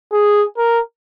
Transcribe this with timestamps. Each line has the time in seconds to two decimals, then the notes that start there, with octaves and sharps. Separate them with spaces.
0.12 G#4
0.58 A#4